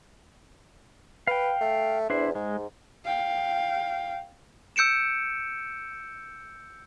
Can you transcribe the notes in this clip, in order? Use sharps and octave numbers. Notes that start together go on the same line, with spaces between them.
B4 F5 G5
A3
E2 D4 E4 C5
G#2 G#3
F5 G5
E6 G6 C#7 D7 E7